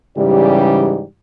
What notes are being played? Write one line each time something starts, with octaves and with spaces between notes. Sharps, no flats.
G#2 C#3 E3 G3 G4 D5